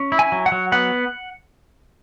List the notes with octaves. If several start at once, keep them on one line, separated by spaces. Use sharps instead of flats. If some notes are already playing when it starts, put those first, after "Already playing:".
Already playing: C#4
E4
G#5
F#3
F#5
F#3
B3 F#5